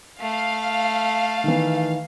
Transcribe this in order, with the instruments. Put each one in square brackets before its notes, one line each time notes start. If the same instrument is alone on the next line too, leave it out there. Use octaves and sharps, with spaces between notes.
[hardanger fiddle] A3 [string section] F5
[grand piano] D#3 E3